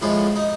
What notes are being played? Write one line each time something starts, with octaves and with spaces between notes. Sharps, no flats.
A2 F3 G#3 C#4 E4
D#4